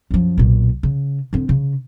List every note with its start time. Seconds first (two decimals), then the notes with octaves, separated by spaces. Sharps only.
0.11 F#2 F3
0.38 B1 A#2
0.83 C#3
1.33 D3 C4
1.49 C#3